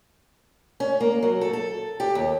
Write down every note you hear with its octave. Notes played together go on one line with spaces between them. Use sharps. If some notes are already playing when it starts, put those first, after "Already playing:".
C#4
A#3
F#3
A4
A4
G4
D#2